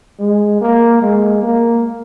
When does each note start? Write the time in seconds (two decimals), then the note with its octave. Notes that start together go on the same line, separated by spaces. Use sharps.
0.19 G#3
0.61 A#3
1.02 G#3
1.43 A#3